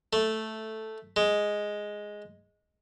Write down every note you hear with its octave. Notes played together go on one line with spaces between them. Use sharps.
A3
G#3